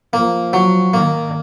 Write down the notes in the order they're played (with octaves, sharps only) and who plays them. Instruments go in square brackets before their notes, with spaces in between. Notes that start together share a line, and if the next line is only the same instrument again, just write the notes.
[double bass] F3 [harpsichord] A#3
[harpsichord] F#3
[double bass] D#3 [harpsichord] A#3